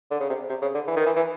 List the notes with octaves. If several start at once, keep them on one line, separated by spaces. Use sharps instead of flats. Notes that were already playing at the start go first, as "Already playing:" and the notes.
D3
C#3
C3
C3
C#3
D3
E3
D#3
E3
E3